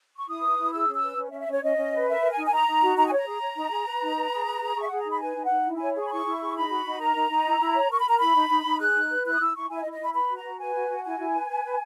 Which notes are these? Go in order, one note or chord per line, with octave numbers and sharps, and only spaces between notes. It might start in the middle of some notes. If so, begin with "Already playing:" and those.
C#6
E4 D#6
B4
E4
G#4 E6
C#4
E6
B4
C#4
E5
C#4
E5
C#4 C#5
C#4 D#5
C#4
B4
A#4 E5
A#4
G#5
D#4
G#5
D#4 A#5
D#4
F#4
D#4 A#5
G#5
C#5 A#5
G#4
C#5
D#4
G#4
B4
D#4
B4
G#4
B4
G#4
G#4 C#6
E5
G#4 F#5
A#5
D#4 B5
B4 G#5
D#4
F#5
D#4
E4
C#5 G#5
G#4 C#6
B5
E4 C#6
E4
G#4
D#4 B5
F#4
D#4
A#4 A#5
D#4
D#4
E4
E4
C#5
A#4 C#6
B5
A#4 A#5
E4 B5
D#4
D#4
D#4
G#4 F#6
D#4
B4
E4 F#6
D#6
E4 E6
E4 C#6
E4 G#5
E5
D#5
E4
D#5
E4 B5
B4 B5
F#4
A#5
F#4
B4 G#5
F#4
F#4
E4 G#5
E4
B4
B4
B4